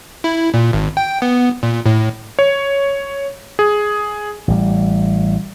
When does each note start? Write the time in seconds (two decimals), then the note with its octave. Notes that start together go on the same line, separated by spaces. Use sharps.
0.24 E4
0.54 A#2
0.73 G#1
0.97 G5
1.22 B3
1.63 A#2
1.86 A2
2.39 C#5
3.59 G#4
4.48 A1 G3